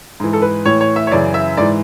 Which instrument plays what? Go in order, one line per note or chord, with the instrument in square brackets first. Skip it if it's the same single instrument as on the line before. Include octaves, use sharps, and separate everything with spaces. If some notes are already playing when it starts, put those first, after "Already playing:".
[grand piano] G#2 E3
A4
B4
A2 E3 C#5
C#5
E5
C#5
F#2 C#3 E3 D5
E5
G#2 E3 D5